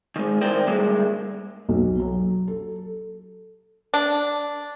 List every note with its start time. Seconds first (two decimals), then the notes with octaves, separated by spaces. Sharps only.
0.16 D#3 G#3
0.41 D#3 E4 A#4 C5 D5 G5
0.67 D2 G2 G#3 A#3
1.69 B1
2.00 F#3
2.48 A4
3.94 D4